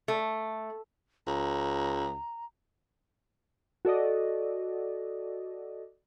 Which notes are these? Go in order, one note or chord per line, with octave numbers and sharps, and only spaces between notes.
A3
C#2 A#5
F#4 A4 D5 D#5